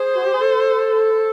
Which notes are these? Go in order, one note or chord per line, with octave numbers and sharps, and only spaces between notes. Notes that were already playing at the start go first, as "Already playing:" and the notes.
Already playing: G#4 C5
F#4
G4
G#4
A4